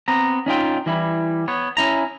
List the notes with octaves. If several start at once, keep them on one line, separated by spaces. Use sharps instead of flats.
B3 C4 A#5
C#4 D#4 F4 G5
E3 G3 E4
B3 C#5
C#4 E4 A#5